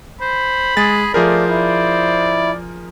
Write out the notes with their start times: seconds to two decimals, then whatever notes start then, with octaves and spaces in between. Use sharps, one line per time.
0.21 C5 B5
0.77 G#3 G#4 A6
1.14 F3 A3 G#4 A#4 C5 D5
1.48 E4 D5